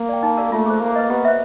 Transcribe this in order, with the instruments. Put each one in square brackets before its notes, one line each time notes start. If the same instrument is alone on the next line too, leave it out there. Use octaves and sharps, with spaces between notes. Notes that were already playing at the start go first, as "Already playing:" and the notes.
Already playing: [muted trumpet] A#3
[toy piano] D5 G5
D#4
G4 A#4 D5 F5
[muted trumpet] A3 [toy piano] F4
[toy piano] G#4 C5
[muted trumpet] A#3 [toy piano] G#4
[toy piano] B4 D#5
[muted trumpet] B3 [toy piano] G4
[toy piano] C5 E5